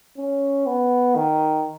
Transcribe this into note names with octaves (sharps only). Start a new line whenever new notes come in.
C#4
B3
D#3